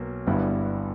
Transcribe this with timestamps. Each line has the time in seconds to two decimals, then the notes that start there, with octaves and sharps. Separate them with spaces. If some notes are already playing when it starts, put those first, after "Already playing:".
Already playing: B1 B2 A#3
0.27 G1 G2 G3 B3 E4